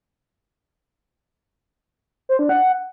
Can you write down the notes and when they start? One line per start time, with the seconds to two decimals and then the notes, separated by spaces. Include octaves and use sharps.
2.29 C5
2.39 D4
2.49 F#5